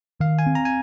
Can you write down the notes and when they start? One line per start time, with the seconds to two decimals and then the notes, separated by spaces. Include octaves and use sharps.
0.20 D#3 F5
0.39 G#5
0.46 C4
0.55 A#5
0.65 G#5